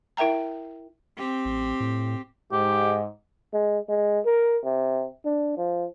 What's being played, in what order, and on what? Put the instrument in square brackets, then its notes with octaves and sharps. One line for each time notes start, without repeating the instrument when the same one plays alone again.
[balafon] E4 A#4 E5 G5 A#5
[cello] C4 G4
[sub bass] A1
A2
[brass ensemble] G#2 [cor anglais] G4
[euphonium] G#3
G#3
A#4
C3
D4
F3